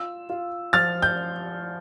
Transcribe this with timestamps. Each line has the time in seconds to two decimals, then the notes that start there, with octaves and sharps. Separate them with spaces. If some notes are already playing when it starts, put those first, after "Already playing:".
Already playing: F4 E6
0.30 F4
0.73 F3 F6 A6
1.02 G6